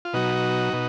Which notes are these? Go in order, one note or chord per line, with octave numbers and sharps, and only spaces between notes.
F4
B2 F#3 D#4 F#4
B2